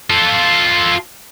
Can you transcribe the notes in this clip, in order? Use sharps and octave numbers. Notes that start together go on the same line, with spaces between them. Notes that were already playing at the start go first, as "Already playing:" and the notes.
F4 A4